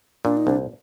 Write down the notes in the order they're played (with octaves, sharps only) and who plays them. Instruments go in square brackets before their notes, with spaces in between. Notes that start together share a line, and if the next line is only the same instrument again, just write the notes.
[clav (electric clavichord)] A#2 [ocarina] D4
[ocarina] D#4
[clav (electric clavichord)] C2 [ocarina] D4